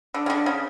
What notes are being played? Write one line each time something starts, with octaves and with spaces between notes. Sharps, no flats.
D3
C#3
D3
C#3